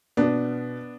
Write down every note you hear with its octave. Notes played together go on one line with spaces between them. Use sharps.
B2 B3 D4